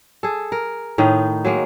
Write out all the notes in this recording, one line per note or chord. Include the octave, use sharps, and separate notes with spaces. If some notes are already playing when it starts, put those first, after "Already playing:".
G#4 A4
A#4
A2 D#3 D#4
F#3 G#3 A#3